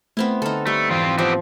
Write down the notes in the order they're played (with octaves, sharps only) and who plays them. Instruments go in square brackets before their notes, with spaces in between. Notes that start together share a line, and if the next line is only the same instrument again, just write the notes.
[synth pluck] A3 [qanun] B3 C4 E4
[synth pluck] D3 F#5 F6 [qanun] D#4 A4
[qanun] G3 [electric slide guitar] A3
[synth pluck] F2 G#2 E3 [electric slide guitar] C4 F4
[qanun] F3 [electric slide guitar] B3 C4 G4